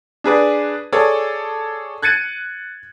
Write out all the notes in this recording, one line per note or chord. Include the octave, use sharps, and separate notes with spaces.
D4 G#4 B4 D5
G#4 A4 C#5 D5
F#6 G#6 A6 C#7 D#7